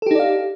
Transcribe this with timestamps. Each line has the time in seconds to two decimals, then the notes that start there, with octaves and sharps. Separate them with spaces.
0.02 A4
0.06 G4
0.11 D#4
0.15 D5
0.19 F5